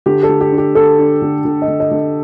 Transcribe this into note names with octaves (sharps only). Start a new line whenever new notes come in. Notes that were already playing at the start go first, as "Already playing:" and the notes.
D3 G4
A4
D3
G4
D4
G4
D3 A4
D4
D3
D3
D#5
D3
D#5
D3